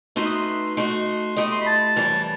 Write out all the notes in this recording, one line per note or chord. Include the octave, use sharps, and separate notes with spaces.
A3 D#4 F#4 B4 E5 C6
D#6
C6
A3 D#4 F#4 C6
A3 E4 G4 D#5 D#6
C6
B5
A5
F#2 E3 G3